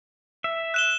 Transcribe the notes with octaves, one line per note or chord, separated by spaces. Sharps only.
E5
F#6 E7 G7